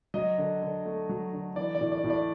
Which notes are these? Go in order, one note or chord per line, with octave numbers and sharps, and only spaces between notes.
F#3 D#5
D3
D3
A3
F#3
D3
E3 D5
D5
A2
D5
A2
D5